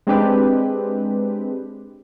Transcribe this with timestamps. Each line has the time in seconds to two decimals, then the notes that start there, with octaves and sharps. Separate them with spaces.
0.07 G#3 C4 D4 G4 B4